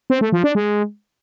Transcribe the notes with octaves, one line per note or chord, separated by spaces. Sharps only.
C4
A3
F3
D4
G#3